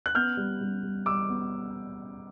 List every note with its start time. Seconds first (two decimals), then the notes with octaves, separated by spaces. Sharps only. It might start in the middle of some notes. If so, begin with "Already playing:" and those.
0.06 F#6
0.15 B3 F6 G6
0.37 G3
0.61 G3
0.83 G3
1.06 G3 D6 E6
1.28 B3